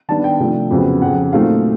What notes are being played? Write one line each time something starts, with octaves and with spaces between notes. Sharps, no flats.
D#3 G3 B3 D4 A5
G5
C3 F3 A3 D4
F2 C#3 F#3 B3
F2 C#3 F3 F#5
A#2 F#3 A3 C4 D#4 F5